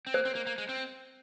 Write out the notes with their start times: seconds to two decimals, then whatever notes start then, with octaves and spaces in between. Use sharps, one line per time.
0.07 C4
0.14 A#3 C5
0.25 C4
0.35 A#3
0.47 A#3
0.58 G#3
0.69 C4